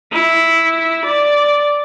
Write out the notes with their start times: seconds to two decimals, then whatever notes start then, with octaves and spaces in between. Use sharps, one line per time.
0.12 E4
1.05 D5